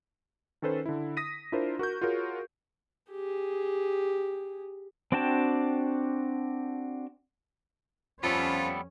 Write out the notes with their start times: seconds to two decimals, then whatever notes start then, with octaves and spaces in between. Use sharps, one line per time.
0.62 D#3 C#4 A4 B4 C5
0.86 D3 E4
1.17 D#6 A#6 B6 D#7
1.52 D4 E4 F4 A#4 C5
1.79 F#4 A#4 C#6 G6
2.01 F4 F#4 G#4 A#4 C#5
3.11 G4 G#4
5.12 C4 D4 F#4 G5 A5
8.23 F2 F3 G3 B3 C#4 F4 A4